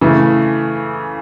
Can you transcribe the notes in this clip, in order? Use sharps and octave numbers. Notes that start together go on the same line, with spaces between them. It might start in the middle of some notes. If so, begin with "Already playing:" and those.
C#3 E3 A3